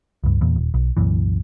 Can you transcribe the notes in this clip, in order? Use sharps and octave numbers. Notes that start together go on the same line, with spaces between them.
C#2 G2
E2 A#2
D#1
B1
C2 F#2 A#2 E3